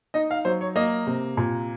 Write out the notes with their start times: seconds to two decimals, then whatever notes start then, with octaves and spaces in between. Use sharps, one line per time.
0.14 D#4 D#5
0.31 F5
0.45 F#3 C5
0.61 C#5
0.76 A#3 D#5
1.07 C3
1.37 A#2